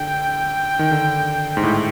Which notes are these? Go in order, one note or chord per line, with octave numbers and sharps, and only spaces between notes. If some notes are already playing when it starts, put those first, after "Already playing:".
Already playing: D3 G5
D#3
D3
G#2
A2